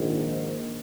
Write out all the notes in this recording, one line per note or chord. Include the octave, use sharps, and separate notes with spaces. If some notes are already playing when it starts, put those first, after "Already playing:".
Already playing: A#1 G#2 D#3